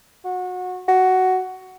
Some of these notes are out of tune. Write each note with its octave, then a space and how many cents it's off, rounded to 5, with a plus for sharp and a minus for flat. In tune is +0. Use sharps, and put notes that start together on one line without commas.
F#4 -25
F#4 +10